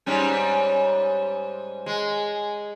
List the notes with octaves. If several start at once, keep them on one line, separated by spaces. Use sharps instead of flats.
G#2 G3 C#4
G#3